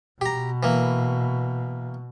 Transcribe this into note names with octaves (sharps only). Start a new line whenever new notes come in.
B2 G4 A#5
E3 A#3